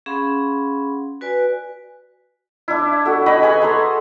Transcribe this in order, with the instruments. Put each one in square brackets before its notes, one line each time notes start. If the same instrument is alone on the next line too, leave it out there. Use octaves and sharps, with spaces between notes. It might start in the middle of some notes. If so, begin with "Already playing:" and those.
[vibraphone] C#4 G#4 F5 F#5 B5 C6
F#4 B4 D5 G#5
[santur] D4 E4
F#4 A4
F#4 D#5 B5
G#4 B4 G#5 B5
A4 A#5 C6